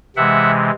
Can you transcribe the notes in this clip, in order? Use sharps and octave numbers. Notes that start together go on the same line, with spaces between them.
C3 E3 G#3 E5 F#5